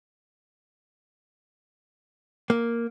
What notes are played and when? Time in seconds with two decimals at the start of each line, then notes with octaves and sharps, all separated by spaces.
2.50 A#3